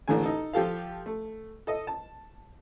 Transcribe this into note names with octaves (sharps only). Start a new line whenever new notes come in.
A1 D3 E3 A3 G#5
D#4 A4
F3 G4 A4 F5
A3
A4 D#5
A5